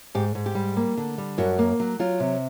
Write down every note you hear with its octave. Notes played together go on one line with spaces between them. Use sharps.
G#2 G4
G#2
G4
G3
A#3
D3
G3
F#2 F#4
A#3
F#3
F#3 F4
C3